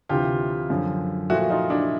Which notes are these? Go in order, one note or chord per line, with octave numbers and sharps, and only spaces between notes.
D2 C3 E3 F4 G4
F#2 D3 F3
A#2 F3 A3 E4 F#4
D#4 F4
D4 E4